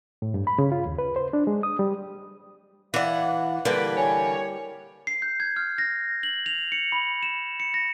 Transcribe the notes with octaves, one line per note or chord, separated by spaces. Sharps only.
A2
G2
B5
C#3
F4
D#2
B4
C5
D4
G#3
D#6
G3
E3 D5 F5 F#5
D3 E3 G3 A#3 B4
C#5 G#5
C7
G6
G#6
F6
A#6
F#7
F7
C#7
B5
E7
C#7
A#6